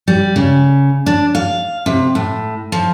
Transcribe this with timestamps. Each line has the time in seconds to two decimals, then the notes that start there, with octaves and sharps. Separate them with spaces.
0.08 G3
0.36 C#3
1.06 D4
1.35 F5
1.86 C3
2.15 A2
2.72 F3